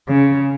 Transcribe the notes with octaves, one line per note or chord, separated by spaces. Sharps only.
C#3